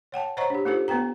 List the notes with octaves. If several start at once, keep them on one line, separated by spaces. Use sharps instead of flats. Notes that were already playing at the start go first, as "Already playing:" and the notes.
C#5 F#5 G5 A5
C5 C#5 D#5 F#5 A#5 C#6
D4 G4
A#3 D#4 F4 G4 A4 C5
A#3 B3 B4 G5 A#5